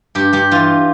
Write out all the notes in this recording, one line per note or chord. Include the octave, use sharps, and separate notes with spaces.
G2 G4
G2 G4
E3 F4